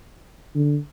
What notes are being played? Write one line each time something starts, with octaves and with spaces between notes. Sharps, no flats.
D3